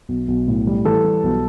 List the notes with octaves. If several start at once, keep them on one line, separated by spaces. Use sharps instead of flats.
B1
B1
A2
G3
E3 A4
G3
B1